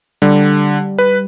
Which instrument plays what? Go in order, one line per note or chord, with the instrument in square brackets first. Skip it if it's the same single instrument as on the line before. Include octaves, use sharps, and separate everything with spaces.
[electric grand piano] D3 [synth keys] G3
[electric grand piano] B4